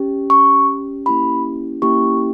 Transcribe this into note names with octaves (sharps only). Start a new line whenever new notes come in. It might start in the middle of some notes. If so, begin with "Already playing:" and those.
Already playing: C#4 G4
C#4 G4 C#6
A#3 C#4 E4 G4 B5
A#3 C#4 E4 G4 C#6